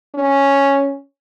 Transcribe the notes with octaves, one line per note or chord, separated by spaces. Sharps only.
C#4